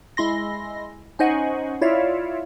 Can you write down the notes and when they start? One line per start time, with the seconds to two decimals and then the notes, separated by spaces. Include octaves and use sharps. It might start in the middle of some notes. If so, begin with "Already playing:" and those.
0.17 G#3 E4 C6 A#6
1.19 C#4 D#4 C5 D#5 F#5 G#5
1.81 E4 F4 C#5 D5 E5 F5